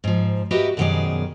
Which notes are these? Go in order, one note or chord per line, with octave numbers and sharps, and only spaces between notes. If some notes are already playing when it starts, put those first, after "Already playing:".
G#2 F3
F#4 G4 A#4 B4 D#5 E5
F#2 B2 D#3 F3 G#4 D5